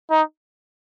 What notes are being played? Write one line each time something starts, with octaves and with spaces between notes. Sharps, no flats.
D#4